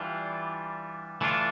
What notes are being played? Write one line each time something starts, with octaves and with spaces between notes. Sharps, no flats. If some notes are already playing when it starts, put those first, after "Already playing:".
Already playing: E3 G3 D4 F4
E3 A3 D4 F4